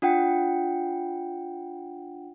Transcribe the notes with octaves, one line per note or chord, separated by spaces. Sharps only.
D4 F4 F#5 G5